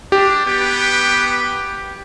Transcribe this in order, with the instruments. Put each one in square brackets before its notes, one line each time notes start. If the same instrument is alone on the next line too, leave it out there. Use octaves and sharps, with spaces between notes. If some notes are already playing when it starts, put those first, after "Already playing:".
[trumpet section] D4 [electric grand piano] G4
[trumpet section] B3 B4 G5